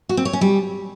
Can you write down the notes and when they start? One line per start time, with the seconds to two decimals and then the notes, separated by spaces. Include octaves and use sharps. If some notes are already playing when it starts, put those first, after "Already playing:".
0.09 F#4
0.17 C4
0.25 C#5
0.33 C#4
0.41 G3